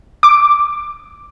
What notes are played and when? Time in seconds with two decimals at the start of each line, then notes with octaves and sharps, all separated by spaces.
0.23 D6